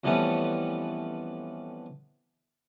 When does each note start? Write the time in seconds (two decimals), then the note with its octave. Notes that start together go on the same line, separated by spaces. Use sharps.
0.04 F2 E3 G3 A3 B3 C#4